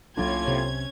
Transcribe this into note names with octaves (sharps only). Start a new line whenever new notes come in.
C2 A2 F#3 A#3 C#4 D4 F4 G#6
C3